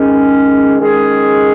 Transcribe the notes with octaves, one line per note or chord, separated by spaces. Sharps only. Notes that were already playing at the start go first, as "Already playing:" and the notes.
Already playing: D#3 G#3 C#4 G#4
D#3 G#3 C#4 G#4